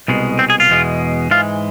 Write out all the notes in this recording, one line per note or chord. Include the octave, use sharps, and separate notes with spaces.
C2 B2 G#3
C4
G#4
F4
E2 B2 G#3
G#2 E3 G#3 F4